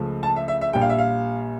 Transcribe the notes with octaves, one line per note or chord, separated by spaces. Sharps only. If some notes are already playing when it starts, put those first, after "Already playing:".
Already playing: C#2 C#3 F3 A3
A5
E5
E5
E5
A#1 A#2 G3 G5
F5
E5
F5